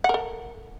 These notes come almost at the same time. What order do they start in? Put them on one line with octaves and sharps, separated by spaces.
F#5 A#4 A4